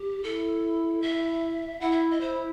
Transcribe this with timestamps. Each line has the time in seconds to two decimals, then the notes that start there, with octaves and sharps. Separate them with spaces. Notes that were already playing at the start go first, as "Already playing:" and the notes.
Already playing: G4
0.23 E4 A4
1.02 E5
1.81 E4 F#5
1.92 E5
2.11 D#5
2.21 E4 C5